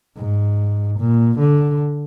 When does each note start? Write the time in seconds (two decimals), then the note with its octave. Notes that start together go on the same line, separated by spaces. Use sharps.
0.17 G#2
0.99 A#2
1.39 D3